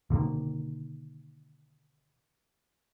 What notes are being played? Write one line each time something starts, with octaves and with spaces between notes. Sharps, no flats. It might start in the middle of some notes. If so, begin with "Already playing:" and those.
B2 D3 D#3 A#3